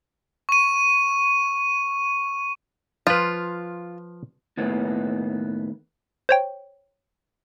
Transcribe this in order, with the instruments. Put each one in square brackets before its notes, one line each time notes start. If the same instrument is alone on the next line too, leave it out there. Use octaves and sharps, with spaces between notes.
[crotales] C#6 D#7
[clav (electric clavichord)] F3 B4 [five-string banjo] F4
[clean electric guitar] D#2 A2 B3
[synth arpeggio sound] C5 C#5 G5